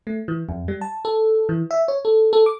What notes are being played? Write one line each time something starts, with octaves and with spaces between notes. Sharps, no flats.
A3
E3
F2
G3
A5
A4
E3
E5
C#5
A4
A4
D6